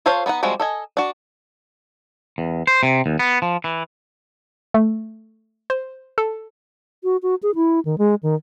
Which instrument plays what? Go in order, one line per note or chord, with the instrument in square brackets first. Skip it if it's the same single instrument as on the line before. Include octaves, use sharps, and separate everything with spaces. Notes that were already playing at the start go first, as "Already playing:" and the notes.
[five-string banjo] F4 A4 C5 C#5 F5
B3 D4 D#4 F#5
F3 G3 G#3 C4 F#4
A4 D#5 G#5
D4 F#4
[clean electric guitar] E2
C5
C3
D#2
B3
F3
E3
[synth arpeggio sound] A3
C5
A4
[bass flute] F#4
F#4
G#4
E4
D#3
G#3
D#3